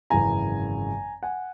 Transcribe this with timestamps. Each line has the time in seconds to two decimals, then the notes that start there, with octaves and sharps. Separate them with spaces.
0.10 G#1 F#2 C#3 E3 G#5 A#5
1.23 F#5 G#5